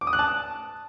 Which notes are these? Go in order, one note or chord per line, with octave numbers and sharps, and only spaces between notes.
D6
D#6
F#6
A5